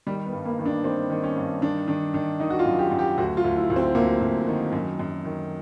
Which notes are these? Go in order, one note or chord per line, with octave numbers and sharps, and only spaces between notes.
D#3 G3
B3
G2
A#3
D#3
D4
D#3 C4
D#3
C#4
G2
D#3 D4
D#3 D4
D#3 D4
D#3 D#4
F#4
F4
F#2
G4
F#2
G4
D2 F#4
F4
D2
E4
D2
C4
D2 A#3
D2
D#3
F#2
F#2
D#3